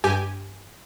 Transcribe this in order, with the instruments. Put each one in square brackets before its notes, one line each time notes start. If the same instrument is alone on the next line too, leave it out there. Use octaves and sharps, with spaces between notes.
[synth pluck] G2 G4 G#5